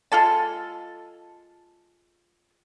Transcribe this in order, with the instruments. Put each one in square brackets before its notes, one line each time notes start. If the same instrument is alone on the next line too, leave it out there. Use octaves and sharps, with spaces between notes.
[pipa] G#3 F4 A4 A5